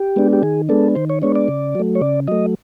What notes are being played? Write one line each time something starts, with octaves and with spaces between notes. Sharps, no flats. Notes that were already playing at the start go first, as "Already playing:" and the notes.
Already playing: G4
G#3 B3 D4
G4
D#3 G#4
G#3 B3 D4 A4
D#3 C5
C#5
G#3 B3 D4 C#5
D5
C#3
F#3 A3
C#5
C#3 D5
F#3 A3 D#5